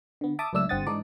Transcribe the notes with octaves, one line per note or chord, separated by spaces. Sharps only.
D3 B3
E5 A5 D6 D#6
C#2 F#2 A2 D4 E5 E6
G1 G2 C4 F#5 D#6 A6
G#2 E3 D4 D#4 D5